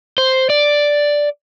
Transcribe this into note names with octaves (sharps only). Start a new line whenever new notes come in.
C5
D5